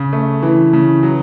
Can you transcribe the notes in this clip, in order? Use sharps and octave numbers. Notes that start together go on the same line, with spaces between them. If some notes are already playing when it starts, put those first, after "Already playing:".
Already playing: C#3
A3
E3
C#3
F#3